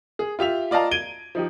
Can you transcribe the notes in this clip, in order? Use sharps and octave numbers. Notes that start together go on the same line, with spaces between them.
G#4
F4 G4 E5 F7
F4 D5 D#5 F5 A5 A#5
G#6 D7 D#7 G7
F3 D#4 G4